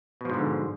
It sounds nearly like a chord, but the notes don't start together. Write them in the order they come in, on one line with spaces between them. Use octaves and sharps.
B2 F3 G#2 D3